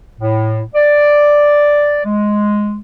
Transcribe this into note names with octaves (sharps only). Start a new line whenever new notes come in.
A2
D5
G#3